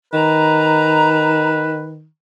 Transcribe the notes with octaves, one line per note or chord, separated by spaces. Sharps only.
D#3 B4 A#5